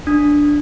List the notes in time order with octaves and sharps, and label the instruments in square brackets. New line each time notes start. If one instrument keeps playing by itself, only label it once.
[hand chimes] D4